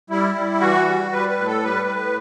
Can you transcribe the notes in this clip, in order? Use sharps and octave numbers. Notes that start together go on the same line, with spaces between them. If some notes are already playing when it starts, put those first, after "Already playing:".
G3 E4
G3
E3 F#4
G3
G3 B4
B4
A2
A4
G3 B4
A2